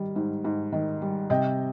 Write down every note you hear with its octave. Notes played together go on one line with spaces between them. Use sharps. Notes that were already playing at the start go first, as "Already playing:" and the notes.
Already playing: D#3 G3
G#2
G#2
D#3
G3
C3 D#5 G5